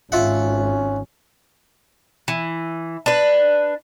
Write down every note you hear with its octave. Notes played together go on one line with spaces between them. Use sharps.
G#1 C#4 F4 E5 F#5
E3
D4 B4